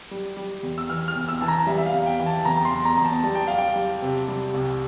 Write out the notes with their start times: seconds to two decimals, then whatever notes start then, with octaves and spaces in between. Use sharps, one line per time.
0.11 G3
0.37 G3
0.63 E2
0.78 E6
0.89 E3 F6
1.08 F6
1.16 E2
1.28 E6
1.41 E3 A5
1.48 A#5
1.67 G3 E5
1.78 E5
1.86 F5
1.94 E2
2.06 G5
2.20 E3
2.26 A5
2.45 E2 A#5
2.65 C6
2.71 E2
2.85 A#5
2.97 E2
3.04 A5
3.23 G3 A5
3.35 G5
3.48 G3 F5
3.58 G5
3.76 G3
4.02 C3
4.28 G3
4.54 C2